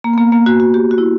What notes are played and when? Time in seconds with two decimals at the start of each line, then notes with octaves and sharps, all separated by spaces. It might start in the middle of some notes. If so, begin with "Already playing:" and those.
0.04 A#3
0.13 B3
0.18 A#3
0.32 A#3
0.46 F#4
0.60 F#4
0.74 G4
0.91 F#4
0.98 E4